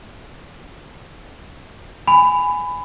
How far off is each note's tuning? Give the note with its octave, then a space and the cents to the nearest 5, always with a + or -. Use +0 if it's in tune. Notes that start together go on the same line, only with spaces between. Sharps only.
G#5 +0 B5 +20